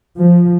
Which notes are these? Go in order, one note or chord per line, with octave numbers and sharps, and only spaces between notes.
F3